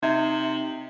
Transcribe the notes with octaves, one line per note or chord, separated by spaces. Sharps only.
C3 D#4 E5 G#6